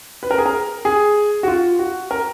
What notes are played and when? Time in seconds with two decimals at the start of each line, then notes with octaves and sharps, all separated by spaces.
0.23 B4
0.31 A#4
0.38 G#4
0.46 A#4
0.85 G#4
1.43 F#4
1.48 F4
1.79 F#4
2.11 A#4